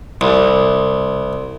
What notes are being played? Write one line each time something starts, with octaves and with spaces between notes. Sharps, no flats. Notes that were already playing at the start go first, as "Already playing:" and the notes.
C2